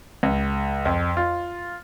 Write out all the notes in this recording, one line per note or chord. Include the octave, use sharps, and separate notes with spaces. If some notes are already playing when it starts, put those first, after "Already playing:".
C#2
F2
F4